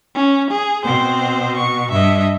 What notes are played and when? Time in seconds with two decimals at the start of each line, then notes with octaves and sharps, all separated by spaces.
0.15 C#4
0.51 G#4
0.85 B2 C4 C5
1.57 C#6
1.92 G2 D#5 E5